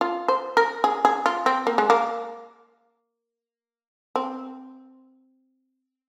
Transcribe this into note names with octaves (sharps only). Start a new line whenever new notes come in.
F4
C5
A#4
G#4
G#4
F4
C4
A#3
G#3
A#3
C4